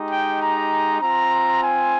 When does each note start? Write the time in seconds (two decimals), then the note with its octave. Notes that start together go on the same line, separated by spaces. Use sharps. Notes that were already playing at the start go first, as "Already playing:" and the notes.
Already playing: G#3 D#4 G4
0.11 G5
0.41 A#5
1.02 C4 F4 A#5
1.63 G#5